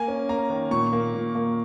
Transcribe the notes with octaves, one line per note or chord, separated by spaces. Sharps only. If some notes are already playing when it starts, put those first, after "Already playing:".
Already playing: A#3 G#5
C#4
A#3 A#5
D#3
A#2 C#6
A#3
A#2
A#3